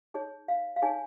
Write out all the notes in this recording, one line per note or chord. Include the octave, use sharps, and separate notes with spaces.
D#4 G#4 C#5
F5
F5
D#4 G#4 C#5 G#5